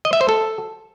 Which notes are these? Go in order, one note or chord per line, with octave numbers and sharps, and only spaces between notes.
D#5
E5
C5
A4